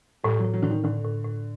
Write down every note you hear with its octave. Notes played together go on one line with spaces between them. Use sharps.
A2 G3
A2 F#3
F#3
A2 D3
D#3
A2 D3
A2
A2